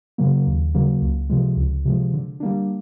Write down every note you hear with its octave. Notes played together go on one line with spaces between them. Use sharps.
C#3 F#3 A#3
D#2
C#3 F#3 A#3
C#2
C3 F3 G#3
C#2
C3 F3 G#3
D3
G3 A#3 D4